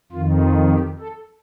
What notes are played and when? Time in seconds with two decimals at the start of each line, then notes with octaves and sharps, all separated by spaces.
0.12 F2 D#3 F4
0.42 F4
0.70 G4
0.99 A4